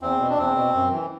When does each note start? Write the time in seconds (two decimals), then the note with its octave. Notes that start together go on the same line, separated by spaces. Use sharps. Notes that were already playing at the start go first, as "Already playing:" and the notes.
0.01 E2 C4
0.20 B2
0.30 D4
0.38 E2 C4
0.56 B2
0.74 F#2
0.92 E3